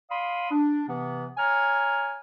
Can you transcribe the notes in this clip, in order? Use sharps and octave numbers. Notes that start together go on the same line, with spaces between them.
D5 F5 B5 C6 D#6
D4
C3 E3 B3
C#5 G#5 A#5 F6